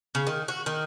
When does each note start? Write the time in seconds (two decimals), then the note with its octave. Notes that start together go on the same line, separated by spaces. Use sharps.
0.15 C#3
0.27 D#3
0.48 F#4
0.66 D#3